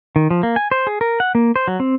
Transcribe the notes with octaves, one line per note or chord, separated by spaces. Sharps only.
D#3
F3
A#3
G#5
C5
G#4
A#4
F#5
A#3
C5
F#3
C4